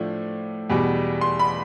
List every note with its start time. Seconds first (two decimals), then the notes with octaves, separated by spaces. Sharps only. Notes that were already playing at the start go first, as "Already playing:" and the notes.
Already playing: A2 F3 A3 D4
0.70 E2 B2 G3
1.21 C6
1.39 B5